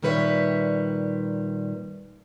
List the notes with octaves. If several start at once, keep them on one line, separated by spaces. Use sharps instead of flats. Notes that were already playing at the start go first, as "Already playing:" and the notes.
A#2 D#3 G3 B4 C#5 E5